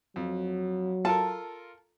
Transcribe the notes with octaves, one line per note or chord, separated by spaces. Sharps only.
F2 F#3
F4 A4 A#4 A5